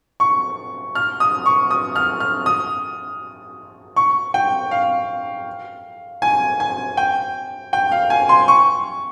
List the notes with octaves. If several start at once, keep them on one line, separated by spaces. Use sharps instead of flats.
C#6
F6
D#6
C#6
D#6
F6
F6
D#6
C#6
G5
F5
G#5
G#5
G5
G5
F5
G#5
C6
C#6